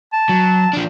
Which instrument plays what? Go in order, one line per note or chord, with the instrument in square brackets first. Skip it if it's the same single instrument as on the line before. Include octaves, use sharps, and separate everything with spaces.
[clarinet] A5
[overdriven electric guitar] F#3
F3 D4